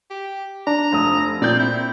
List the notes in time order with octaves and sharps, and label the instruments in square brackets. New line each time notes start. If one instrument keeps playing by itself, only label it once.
[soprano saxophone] G4
[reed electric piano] D4 [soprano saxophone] A#5
[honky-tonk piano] F1 D#6
[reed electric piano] A#2 [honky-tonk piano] C4 G6 [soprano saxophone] D5
[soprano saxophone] E4